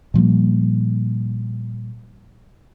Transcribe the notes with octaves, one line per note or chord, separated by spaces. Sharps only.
A#2 F3 G3 A#3